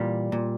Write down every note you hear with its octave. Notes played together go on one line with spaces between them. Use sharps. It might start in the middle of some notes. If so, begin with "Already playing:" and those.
Already playing: A#2 E3 G3
A#2